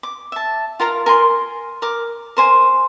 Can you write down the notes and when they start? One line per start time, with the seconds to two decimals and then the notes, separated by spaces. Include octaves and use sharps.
0.03 D6
0.32 E5 A5
0.80 F4 A#4 F5 A#5
1.06 A#4 G#5 C6
1.82 A#4 D6
2.37 A#4 C5 G#5